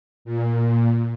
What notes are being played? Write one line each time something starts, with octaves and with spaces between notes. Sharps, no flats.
A#2